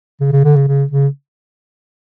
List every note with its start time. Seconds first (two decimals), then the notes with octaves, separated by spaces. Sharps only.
0.21 C#3
0.32 C#3
0.45 D3
0.56 C#3
0.68 C#3
0.91 C#3